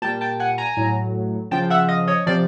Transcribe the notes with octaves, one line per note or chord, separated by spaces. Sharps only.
A#2 G3 G5 A5
G5 A5
F#5 G#5
G#5 A#5
A2 F#3
C#3 F3 G5 A5
E5 F#5
D#5 F5
C#5 D#5
C3 F3 C5 D5